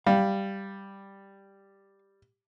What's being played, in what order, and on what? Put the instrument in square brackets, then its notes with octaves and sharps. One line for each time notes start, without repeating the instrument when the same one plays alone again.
[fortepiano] G3 [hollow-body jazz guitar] F5